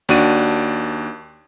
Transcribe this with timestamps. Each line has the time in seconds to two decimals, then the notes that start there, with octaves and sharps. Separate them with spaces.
0.09 D#2 D4 F#4 D5 D#7